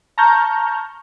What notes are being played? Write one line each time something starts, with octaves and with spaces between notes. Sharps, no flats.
A5 A#5 C#6 F6 G6